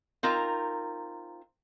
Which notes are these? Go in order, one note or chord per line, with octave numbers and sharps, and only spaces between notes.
C4 D#4 F4 A#4